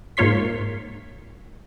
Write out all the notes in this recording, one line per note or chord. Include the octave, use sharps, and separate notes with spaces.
G#2 A#3 F4 C#5 C6 B6